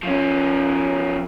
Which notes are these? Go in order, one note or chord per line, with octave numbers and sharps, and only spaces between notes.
F3 C#4